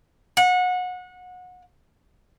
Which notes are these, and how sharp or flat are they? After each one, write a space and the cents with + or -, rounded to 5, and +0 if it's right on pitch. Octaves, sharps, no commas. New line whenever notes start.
F#5 -25